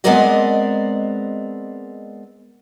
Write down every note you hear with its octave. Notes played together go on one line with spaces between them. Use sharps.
G#3 B3 C4 A#4 D5 D#5